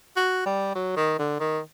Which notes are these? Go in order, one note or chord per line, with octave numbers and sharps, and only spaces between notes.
F#4
G3
F#3
D#3
D3
D#3